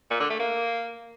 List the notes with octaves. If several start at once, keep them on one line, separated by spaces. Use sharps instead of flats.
A#2
D3
A3
A#3